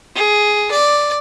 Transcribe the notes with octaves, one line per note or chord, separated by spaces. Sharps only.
G#4
D5